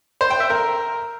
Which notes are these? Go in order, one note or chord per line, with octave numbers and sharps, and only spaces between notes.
C5
G5
E5
A#4